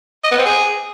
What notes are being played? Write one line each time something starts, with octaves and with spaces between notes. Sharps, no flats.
D#5
B3
C4
G#4